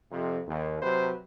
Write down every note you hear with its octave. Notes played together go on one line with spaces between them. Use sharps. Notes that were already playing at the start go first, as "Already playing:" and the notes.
F2 C3
D#2
C3 F#3 B4 C5